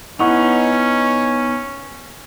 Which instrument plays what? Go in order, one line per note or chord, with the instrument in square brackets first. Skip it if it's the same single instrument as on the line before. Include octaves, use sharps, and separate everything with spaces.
[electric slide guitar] B3 D#4 [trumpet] C#4 [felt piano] E4 F#5 C#6